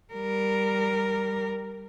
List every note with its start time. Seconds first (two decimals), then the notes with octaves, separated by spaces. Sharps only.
0.13 G3 A#4